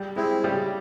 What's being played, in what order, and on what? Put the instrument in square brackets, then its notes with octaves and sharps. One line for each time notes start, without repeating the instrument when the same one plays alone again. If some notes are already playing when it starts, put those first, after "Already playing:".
Already playing: [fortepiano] G3
[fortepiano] G#3 [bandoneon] C4 E4
[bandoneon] C#3 [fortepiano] G3